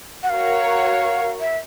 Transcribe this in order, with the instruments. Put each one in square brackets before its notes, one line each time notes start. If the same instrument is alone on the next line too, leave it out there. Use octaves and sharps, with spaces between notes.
[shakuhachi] F#5
[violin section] F#4 A#4 C#5 [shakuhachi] F5
[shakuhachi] E5